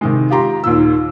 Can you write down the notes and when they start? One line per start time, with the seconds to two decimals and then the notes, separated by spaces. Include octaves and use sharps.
0.01 C3 D#3 G#3
0.30 F4 G4 A#5 C6
0.64 D#2 A#2 E6